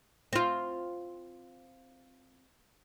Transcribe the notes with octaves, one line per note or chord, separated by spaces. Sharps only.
C4 F4